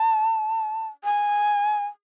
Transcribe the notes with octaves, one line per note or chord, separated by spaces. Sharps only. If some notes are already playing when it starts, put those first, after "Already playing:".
Already playing: A5
G#5